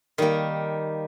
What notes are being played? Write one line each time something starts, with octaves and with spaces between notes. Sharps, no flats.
D#3 G3 A#3